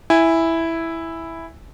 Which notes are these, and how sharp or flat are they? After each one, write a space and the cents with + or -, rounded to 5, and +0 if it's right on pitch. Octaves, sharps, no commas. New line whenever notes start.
E4 +0 G#5 -15